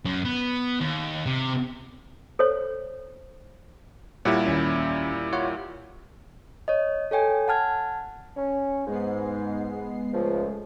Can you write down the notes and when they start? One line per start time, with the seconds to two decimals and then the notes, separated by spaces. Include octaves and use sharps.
0.05 F#2
0.25 B3
0.80 D#2
1.26 C3
2.39 A4 C5 C#5
4.25 A#2 G3 E4 C#5 D5 F#5
4.46 D#2 C#4
5.33 F4 C#5 F#5
6.68 C#5 D#5
7.11 A4 C#5 G5 G#5
7.48 F#5 A5 F6 G#6
8.37 C#4
8.87 G#2 G#3 B3 C7
10.14 C#2 F3 G#3 A3